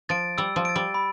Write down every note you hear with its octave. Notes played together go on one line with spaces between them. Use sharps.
F3 A6 D7
G3 E6
F3
A6 D7
G3
B5